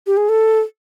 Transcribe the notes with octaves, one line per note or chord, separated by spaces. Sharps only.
G4
G#4
A4